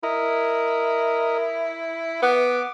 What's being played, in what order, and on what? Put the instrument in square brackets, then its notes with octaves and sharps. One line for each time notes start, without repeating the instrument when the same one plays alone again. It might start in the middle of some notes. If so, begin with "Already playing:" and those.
[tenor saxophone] E4 [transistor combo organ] A#4 D#5
[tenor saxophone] B3 [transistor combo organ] D6